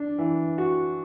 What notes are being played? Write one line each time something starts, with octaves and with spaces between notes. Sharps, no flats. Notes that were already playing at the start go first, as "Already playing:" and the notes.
Already playing: D4
E3
F#4